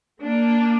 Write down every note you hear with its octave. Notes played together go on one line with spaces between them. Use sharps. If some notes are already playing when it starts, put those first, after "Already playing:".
A#3 D4